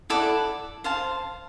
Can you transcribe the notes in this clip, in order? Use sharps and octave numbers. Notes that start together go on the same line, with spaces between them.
E4 A4 D5 F#5
C5 F5 A5